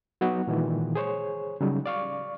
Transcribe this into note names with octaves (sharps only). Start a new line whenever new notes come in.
F#3 B3 D#4 F#4
A#2 D#3 E3 G#3
G#4 C5 C#5
C#3 F#3 G3 D#4
D5 F5 C#6